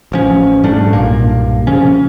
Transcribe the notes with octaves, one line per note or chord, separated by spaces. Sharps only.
A1 F3 C#4
G#2 G3 A3 D4
B1 G2 A#2 A#3
C#3 F3 C#4